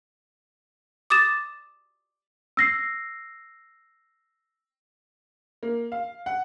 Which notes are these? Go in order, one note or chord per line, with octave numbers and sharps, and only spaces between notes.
D6 D#6 A6 E7
E6 A#6 C7
A#3
F5
F#5